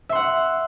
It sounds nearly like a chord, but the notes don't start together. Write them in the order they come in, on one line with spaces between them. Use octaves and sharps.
E5 C6 F#5